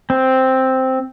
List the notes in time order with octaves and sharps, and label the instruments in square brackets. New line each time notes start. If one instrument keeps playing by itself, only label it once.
[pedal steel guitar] C4